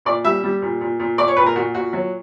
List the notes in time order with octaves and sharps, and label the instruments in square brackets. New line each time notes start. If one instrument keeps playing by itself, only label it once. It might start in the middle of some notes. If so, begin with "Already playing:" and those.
[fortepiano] A#2 D5
G3 E5
G3
A#2
A#2
A#2
A#2 D5
C#5
A#2 B4
A#4
A#2 F#4
A#2 F#4
F#3